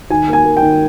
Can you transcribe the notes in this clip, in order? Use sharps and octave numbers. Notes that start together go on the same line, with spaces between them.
D#3 G#5
A#3
G#5
A#3
G5
D#3